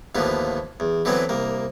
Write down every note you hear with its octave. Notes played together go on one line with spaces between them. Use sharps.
D#2 A2 D3 F3 B3
E2
D3 E3 F#3 B3 C4
C2 A#3